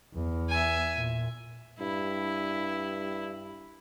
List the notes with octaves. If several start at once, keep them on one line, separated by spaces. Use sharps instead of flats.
E2
E5 G#5
A#2
G2 E4